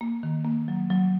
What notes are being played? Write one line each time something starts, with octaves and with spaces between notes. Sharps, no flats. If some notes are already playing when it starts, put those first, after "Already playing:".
A#3
D#3
A#3
F#3
F#3